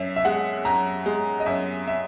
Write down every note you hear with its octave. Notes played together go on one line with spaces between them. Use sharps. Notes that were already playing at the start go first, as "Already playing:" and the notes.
Already playing: F#2 E5
E5
G#3 F#5
F#2 A#5
G#3
D#5
F#2 E5
E5